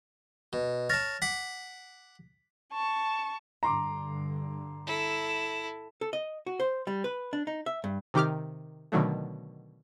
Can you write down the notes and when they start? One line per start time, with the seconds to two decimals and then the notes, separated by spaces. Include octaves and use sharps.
0.53 B2
0.90 C#5 A5 F6 A6 A#6
1.22 F#5 D6 B6
2.73 A5 C#6
3.63 G2 D3 A#5 C6 D6
4.87 E4 A4
6.01 A4
6.13 D#5
6.46 F#4
6.60 C5
6.87 G3
7.04 B4
7.33 D4
7.47 D#4
7.66 E5
7.84 G2
8.14 C3 D#3 G4 D6 F6
8.92 B2 D3 D#3 F#3 A3